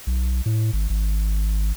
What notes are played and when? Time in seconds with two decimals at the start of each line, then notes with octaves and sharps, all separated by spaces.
0.07 B1
0.46 A2
0.73 G#1
0.90 G#1